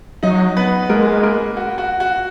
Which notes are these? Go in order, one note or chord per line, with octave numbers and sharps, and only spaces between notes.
F#3 D#4 D#5
B3 B4
G#3 A#3 A#4
A#3 A#4
F#4
F#4
F#4